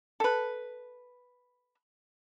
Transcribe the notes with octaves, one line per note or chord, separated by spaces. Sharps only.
A4 B4